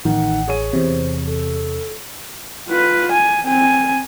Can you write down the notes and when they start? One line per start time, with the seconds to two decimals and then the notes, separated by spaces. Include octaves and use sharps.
0.05 A1 D#3 F#5
0.48 G#4 C#5 D#7
0.73 E2 C3 C5
1.26 A4
2.68 F4 B4
3.12 G#5
3.42 C4 G#5